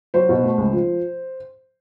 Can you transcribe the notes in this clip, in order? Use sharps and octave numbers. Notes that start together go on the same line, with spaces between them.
F#3 C5
B2
A3
C#2
F3